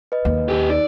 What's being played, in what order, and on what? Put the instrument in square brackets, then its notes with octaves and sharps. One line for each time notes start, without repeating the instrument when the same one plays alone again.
[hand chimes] B4 D#5
[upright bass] D#2
[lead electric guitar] C#3 G4
[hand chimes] D#4 [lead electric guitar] D5